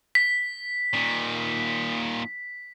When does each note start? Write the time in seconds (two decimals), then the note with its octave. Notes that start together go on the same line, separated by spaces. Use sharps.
0.15 B6
0.94 A#2 D#3